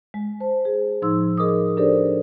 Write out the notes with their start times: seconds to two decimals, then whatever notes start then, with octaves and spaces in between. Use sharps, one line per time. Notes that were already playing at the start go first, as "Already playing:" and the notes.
0.14 G#3
0.40 C5 A5
0.65 G#4
1.02 A2 F3 D#4 C6 E6
1.38 G#4 A#4 D#5 D6 D#6
1.77 D4 G4 A4 A#4 C5 D5